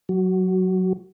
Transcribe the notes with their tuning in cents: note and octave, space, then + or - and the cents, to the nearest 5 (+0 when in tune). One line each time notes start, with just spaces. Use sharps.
F#3 +0 F#4 +15